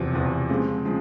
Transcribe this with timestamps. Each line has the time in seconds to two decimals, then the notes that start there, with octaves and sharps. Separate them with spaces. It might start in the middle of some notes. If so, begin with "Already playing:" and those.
Already playing: E2 C3 F3
0.13 E2 C3 F3
0.49 C#3 F3 G#3 C4
0.85 C#3 F3 G#3